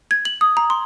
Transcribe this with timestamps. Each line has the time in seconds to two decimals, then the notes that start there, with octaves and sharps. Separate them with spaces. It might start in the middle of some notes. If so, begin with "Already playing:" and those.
0.11 G#6
0.25 F#7
0.41 D#6
0.57 A#5
0.70 C6